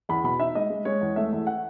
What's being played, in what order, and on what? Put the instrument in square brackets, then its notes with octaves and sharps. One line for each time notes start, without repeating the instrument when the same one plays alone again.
[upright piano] E2 B5
B2 B5
D#4 E5
G#3 D#5
G#3
G#3 C#5
E2
A3 E5
E2
F#5